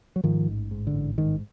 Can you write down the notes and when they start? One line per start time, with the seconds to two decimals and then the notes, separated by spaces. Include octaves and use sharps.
0.16 F#3
0.24 G#2 D#3 F3
0.48 A1
0.71 G#2
0.87 D3
0.94 A1
1.18 G#2 D#3